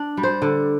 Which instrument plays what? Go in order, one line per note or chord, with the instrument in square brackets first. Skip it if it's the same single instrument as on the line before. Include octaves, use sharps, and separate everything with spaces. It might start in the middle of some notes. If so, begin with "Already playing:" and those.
Already playing: [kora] D4
G3
C5
D3